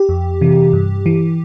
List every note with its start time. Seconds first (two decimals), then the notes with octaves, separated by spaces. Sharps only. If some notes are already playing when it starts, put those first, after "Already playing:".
Already playing: G4
0.09 F2
0.41 C3 E3
0.73 G2
1.06 E3